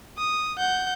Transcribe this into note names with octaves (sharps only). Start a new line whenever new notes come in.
D#6
F#5 G6